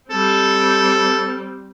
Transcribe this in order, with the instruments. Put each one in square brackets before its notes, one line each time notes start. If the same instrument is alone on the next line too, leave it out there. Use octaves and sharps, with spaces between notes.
[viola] G3 C4 [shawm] A4